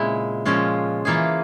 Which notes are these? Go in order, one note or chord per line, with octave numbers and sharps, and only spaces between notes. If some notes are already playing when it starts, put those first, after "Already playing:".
Already playing: A#2 C#3 G#3 C4 E4
A#2 F3 G#3 C#4 F4
E3 A#3 F4 G#4